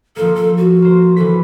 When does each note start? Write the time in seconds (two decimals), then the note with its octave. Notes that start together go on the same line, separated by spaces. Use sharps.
0.16 F3 A#3 A4
0.35 A4
0.57 F#4
0.82 A#3 C5
1.16 E3 A4 B6